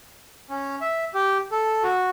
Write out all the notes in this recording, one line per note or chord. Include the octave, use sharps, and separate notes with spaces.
C#4
E5
G4
A4
F#4